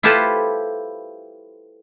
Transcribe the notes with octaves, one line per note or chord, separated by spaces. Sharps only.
E4 F4 G4 A4 B4 C5